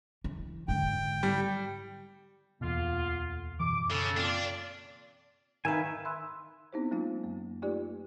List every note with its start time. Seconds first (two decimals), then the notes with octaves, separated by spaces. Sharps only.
0.24 E3
0.68 G#2 D3 G5
1.23 G3
2.61 D1 E2 B2 D3 A#3 F4
3.60 F#2 B2 E3 D6
3.90 C#3 A4
4.17 A#3 C4 D4 F4
5.65 D#3 B4 E5 F5 G#5
6.05 E5 B5 C6 E6 F#6
6.73 B3 C4 D#4 E4 G4 C5
6.91 F#3 G#3 A#3 C#4 D#4 F4
7.23 F#2 A#3
7.62 A3 D#4 F4 G4 B4 D5